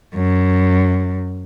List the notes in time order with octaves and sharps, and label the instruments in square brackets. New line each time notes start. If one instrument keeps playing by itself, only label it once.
[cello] F#2